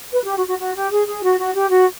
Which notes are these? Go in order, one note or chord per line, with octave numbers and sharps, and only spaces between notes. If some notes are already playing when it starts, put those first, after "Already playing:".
B4
G4
F#4
F#4
F#4
G4
G#4
G#4
F#4
F#4
G4
F#4